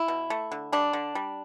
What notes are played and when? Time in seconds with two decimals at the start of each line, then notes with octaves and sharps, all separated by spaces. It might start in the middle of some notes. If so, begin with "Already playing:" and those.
Already playing: E4
0.08 B2
0.30 A3
0.52 D3
0.72 G3 D4
0.93 D3
1.15 G3